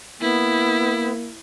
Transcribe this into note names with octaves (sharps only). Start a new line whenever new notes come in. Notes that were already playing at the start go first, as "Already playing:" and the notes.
A#3 B3 E4